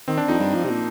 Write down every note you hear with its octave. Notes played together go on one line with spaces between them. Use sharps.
D#3 C4
D4
F2 D#4
G2
F3
C3
A#2